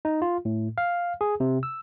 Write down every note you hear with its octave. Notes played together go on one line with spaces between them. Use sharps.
D#4
F4
A2
F5
G#4
C3
E6